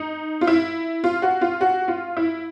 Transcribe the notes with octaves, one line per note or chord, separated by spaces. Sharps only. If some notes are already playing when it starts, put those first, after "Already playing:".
Already playing: D#4
F4
E4
F4
F#4
F4
F#4
F4
E4